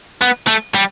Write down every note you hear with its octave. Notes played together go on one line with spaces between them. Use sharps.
B3
A3
G3